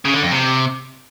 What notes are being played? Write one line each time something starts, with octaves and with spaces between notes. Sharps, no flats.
C#3
D3
F2
C3